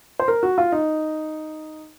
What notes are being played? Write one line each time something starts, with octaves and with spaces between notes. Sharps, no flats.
C5
A#4
F#4
F4
D#4